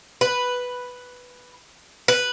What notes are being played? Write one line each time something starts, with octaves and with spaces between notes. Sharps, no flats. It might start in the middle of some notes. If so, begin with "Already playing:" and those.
B4
B4